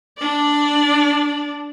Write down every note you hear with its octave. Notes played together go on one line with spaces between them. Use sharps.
D4 D5